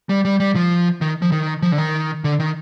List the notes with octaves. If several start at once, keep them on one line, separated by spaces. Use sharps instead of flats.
G3
G3
G3
F3
D#3
F3
D#3
F3
D3
D#3
D3
D#3